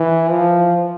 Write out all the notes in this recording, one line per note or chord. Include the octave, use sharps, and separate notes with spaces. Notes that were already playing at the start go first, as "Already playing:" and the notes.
Already playing: E3
F3